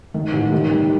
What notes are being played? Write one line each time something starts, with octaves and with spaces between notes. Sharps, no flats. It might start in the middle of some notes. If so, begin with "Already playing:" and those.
D#3
A1
D#3
G3